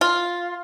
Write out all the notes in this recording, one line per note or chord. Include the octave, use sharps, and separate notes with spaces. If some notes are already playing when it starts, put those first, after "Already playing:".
F4